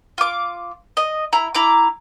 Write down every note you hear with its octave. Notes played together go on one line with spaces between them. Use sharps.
F4 D6
D#5
E4 A#5
E4 A#5 D6